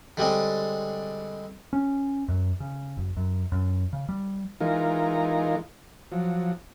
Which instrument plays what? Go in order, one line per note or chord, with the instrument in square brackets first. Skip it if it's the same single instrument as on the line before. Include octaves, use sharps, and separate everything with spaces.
[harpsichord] D3 G3 G#3 C4
[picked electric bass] C#4
F#2
C#3
F#1
F#2
F#2
C#3
G3
[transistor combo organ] E3 G#3 D#4 F4 A#4
F3 F#3